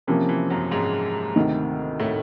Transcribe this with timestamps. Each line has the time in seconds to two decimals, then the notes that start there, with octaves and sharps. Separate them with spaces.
0.07 C3 E3 F3 A#3 C#4
0.29 E3
0.50 F#2 F#3
0.71 G#2 G#3
1.36 D2 C3 D#3
2.00 A2 A3